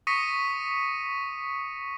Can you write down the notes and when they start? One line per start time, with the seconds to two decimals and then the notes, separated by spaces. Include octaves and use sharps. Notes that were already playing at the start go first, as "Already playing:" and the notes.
0.07 C#6 D#6 A#6 B6 C#7 D#7